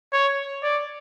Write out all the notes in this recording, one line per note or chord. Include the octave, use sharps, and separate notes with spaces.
C#5
D5